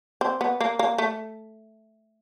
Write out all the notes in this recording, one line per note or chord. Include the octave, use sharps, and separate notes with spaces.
C4
B3
A#3
A#3
A3